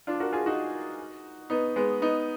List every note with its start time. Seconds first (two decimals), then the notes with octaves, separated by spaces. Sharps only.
0.07 D4 F4
0.20 F#4 A#4
0.33 F4 G#4
0.46 D#4 F#4
1.50 B3 D#4
1.76 G#3 B3
2.02 B3 D#4